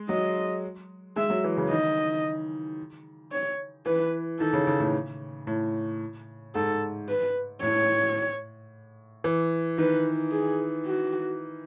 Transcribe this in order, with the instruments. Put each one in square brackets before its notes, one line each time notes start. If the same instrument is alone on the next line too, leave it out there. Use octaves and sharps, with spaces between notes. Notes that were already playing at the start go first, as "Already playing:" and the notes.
Already playing: [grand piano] G#3
[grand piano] F#3 [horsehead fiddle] D#5
[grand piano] G#3 [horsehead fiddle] E5
[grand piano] F#3
E3
C#3
[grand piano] D#3 [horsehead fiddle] D#5
[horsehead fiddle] C#5
[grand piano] E3 [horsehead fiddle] B4
[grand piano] D#3 [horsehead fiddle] A4
[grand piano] C#3
C#3
A2
A2
[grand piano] G#2 [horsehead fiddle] A4
[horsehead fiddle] B4
[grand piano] A2 [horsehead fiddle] C#5
[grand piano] E3
[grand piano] D#3 [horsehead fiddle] B4
[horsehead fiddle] G#4
F#4